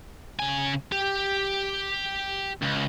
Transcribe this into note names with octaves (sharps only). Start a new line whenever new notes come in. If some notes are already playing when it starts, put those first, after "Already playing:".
C#3 G#5
G4
C#2